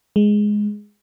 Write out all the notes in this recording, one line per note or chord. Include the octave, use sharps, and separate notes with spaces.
G#3